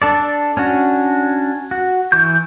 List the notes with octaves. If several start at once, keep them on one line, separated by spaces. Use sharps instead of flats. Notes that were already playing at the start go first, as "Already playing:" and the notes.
D4 A4 D5
C#4 D4 F#4
F#4
E3 C#6 G6